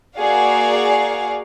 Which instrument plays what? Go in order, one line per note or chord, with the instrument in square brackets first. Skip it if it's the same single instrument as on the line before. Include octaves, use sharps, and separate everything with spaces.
[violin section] A#3 F#4 G#4 D5 F5